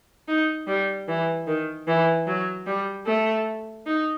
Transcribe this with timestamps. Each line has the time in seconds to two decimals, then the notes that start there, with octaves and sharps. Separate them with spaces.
0.28 D#4
0.67 G3
1.08 E3
1.47 D#3
1.87 E3
2.27 F#3
2.67 G3
3.06 A3
3.86 D#4